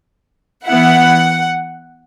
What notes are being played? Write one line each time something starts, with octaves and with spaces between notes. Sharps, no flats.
E3 B3 E4 F#5